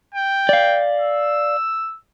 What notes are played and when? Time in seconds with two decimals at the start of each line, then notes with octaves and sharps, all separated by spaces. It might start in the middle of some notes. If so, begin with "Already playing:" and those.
0.14 G5
0.49 D5 F5
1.00 E6